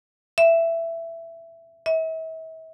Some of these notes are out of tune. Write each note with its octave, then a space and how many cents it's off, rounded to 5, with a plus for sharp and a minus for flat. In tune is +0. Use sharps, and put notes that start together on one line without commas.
E5 +15
E5 -40